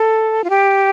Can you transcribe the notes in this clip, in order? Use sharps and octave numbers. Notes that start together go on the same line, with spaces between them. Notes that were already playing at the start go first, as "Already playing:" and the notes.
Already playing: A4
F4
G4